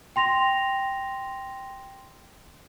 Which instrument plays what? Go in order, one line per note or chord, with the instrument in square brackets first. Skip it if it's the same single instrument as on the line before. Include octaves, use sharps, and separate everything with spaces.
[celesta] G5 C6 A#6 F7